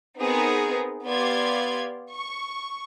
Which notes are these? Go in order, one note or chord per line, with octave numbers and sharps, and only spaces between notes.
B3 C4 D#4 G#4 A#4
B3 G4 D5 F5 C6 G#6
C#6